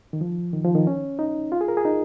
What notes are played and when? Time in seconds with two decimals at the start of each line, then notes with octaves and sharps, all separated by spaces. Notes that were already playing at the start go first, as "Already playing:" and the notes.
0.13 D#3
0.21 F3
0.53 D#3
0.64 F3
0.75 D#3
0.87 C#4
1.19 D#4
1.52 F4
1.61 G#4
1.68 A#4
1.77 G#4
1.85 D#4